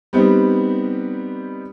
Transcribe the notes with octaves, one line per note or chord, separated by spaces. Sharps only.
G3 B3 C4 D#4 G4